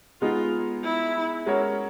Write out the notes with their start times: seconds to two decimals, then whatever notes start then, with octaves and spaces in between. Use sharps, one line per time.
0.21 G#3 B3 D#4 F4 G#4
0.84 E4
1.46 G#3 C#4 F#4 A#4 C#5